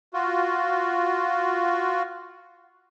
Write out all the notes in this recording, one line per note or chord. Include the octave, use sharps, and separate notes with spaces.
F4 F#4